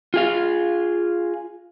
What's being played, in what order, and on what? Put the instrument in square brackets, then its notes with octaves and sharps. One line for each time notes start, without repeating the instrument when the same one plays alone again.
[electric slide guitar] F4 G#4 F5